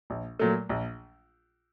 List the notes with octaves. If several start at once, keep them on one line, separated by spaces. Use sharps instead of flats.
A#1
A#2 F#3 A3
A#1